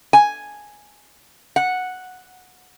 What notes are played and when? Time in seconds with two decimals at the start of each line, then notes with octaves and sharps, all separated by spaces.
0.13 G#5
1.56 F#5